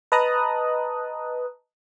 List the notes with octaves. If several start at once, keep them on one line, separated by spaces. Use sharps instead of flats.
B4 D#5 A5 A#5 D#6 F#6